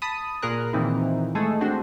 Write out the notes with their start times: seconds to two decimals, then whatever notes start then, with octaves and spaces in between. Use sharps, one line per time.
0.02 A5 B5 D#6
0.42 A#2 G#4 A#4 F#6
0.73 A#2 D#3 E3 C4 D#4 E4
1.35 G#3 A3 G#4 A4
1.61 C4 D4 F#4 C5